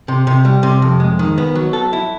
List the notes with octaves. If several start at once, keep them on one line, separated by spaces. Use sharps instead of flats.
C3
C3
G3
C3
F2
G#3
D#3
B3
F#3
A4
E4